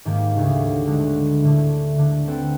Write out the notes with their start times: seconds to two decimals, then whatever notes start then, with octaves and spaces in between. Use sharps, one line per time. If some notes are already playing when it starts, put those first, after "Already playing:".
0.05 G#2 D#3 A#3 G4 G#6
0.35 D2 C#3 D#4
0.86 D3 G#3 B3
1.42 A2 D3
1.98 D3
2.28 C4 A4 B4 G5